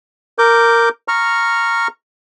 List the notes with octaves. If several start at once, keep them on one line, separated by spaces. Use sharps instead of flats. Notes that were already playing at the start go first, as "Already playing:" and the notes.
A#4 D6 G6
A#5 C#6 F6